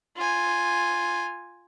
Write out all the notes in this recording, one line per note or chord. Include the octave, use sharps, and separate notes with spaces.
F4 G#5